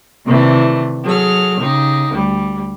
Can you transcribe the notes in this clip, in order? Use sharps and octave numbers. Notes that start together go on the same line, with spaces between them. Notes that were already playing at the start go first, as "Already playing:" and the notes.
C3 D#3 E3 G3 A3
F#3 G#4 A4 F6
C#3 D#4 G4
D2 G3